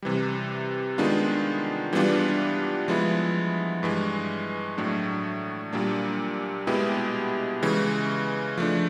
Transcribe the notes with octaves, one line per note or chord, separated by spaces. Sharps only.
C3 E3 G3
D#3 G#3 B3 D4 F4
E3 G3 B3 D4 F4
F3 G#3 B3 E4
G2 E3 G#3
A2 F#3 A3 D4
A#2 G3 A#3 D4
B2 G#3 B3 E4 G4
C#3 E3 G#3
F3 A3 D4